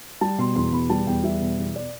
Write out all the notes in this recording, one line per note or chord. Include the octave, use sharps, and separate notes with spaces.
G3 A5
B2 C6
E2 C6
B2 B5
G3 A5
E2 G5
G3 E5
B2
E2
D5